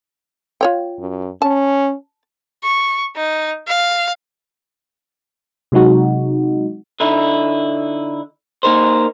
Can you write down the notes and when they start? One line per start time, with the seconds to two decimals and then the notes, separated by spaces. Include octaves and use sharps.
0.61 F4 C#5 G5
1.00 F#2
1.42 C#4 A5
2.64 C#6
3.16 D#4
3.67 F5
5.72 C3 F#3 G#3 D#4 F#4
7.00 D3 D#4 E4
8.63 A#3 D#4 A#4 C5